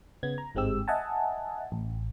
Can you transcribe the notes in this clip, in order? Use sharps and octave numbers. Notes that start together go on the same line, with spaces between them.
C#3 B3 G#6
A#5
G1 G#2 G#3 C4 G4 E6
D#5 E5 F#5 G#5 A5
A1